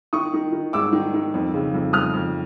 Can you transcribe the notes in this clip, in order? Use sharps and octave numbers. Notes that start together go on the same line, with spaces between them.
D#3 C#6 D#6
D#3
D#3
G#2 D6 E6
D#3
D#3
F2
C#3
F2
F2 D#6 F6
F2